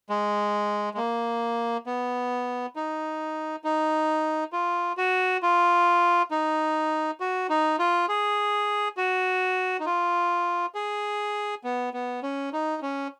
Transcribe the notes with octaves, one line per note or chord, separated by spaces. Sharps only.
G#3
G#3
A#3
B3
D#4
D#4
F4
F#4
F4
D#4
F#4
D#4
F4
G#4
F#4
D#4
F4
G#4
B3
B3
C#4
D#4
C#4